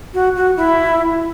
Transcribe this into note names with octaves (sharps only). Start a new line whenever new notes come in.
F#4
F#4
E4